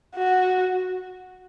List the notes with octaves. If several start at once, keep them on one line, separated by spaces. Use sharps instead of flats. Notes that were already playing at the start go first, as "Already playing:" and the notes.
F#4